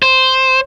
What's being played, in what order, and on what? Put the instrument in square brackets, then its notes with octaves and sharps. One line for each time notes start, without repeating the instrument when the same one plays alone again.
[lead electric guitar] C5